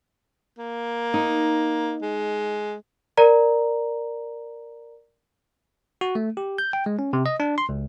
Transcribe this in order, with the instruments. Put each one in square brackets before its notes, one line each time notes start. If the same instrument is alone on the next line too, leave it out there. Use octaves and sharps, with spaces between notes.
[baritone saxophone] A#3
[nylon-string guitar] D#4
[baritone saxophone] G#3
[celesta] A#4 D5 A#5
[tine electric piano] F#4
A3
G4
G6
G5
G#3
C#4
C3
D#5
D4
C6
C#2